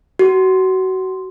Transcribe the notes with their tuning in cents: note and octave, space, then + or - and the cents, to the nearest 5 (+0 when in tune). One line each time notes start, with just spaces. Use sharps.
F#4 +25